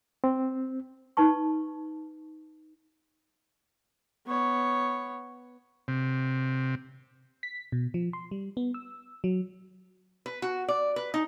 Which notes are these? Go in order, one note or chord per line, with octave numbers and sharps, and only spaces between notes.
C4
D#4 B4 A5 C#6
B3 C#5
C3
B6
B2
F3
C6
G3
B3
E6
F#3
B4
F#4
D5
B4
D#4